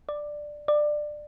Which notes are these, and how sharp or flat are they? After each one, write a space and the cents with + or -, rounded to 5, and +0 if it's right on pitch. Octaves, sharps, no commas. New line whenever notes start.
D5 +10
D5 +20